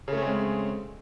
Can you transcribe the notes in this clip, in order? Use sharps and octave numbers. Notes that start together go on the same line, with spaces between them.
C#3 G#3 A3 C4 C#4